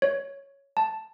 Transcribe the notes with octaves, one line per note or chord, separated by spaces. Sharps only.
C#5
A5